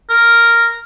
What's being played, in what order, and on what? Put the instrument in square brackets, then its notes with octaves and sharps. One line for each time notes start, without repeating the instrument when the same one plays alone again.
[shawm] A#4